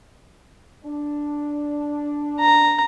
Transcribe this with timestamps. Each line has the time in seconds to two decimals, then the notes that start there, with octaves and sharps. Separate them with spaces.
0.84 D4
2.40 A#5